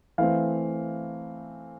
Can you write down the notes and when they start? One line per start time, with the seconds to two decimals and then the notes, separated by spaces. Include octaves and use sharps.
0.18 E3 A3 C4 F5